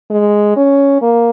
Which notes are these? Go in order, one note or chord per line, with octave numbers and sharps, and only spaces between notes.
G#3
C#4
A#3